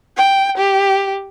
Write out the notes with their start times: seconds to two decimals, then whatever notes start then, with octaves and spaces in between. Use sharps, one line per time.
0.17 G5
0.58 G4